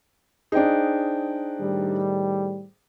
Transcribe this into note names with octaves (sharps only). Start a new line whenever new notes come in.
D4 D#4 G#4 C5 G5
A2 D#3 G3